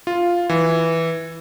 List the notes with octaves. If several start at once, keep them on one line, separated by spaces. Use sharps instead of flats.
F4
E3